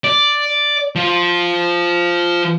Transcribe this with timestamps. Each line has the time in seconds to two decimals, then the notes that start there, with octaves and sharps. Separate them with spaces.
0.04 D5
0.96 F3